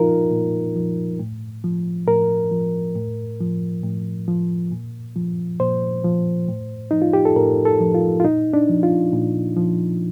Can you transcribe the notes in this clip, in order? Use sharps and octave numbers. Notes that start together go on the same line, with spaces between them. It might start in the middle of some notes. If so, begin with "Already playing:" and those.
Already playing: A#2 F3 D#4 F4 A#4
A#2
F3
A2
F3
A2 A#4
F3
A2
F3
A2
F3
A#2
F3
A#2 C5
F3
A2
F3 D#4
F4
G4
A4
A2 A#4
A4
F3
F4
F4
A#2 D#4
D4
F3
F4
A#2
F3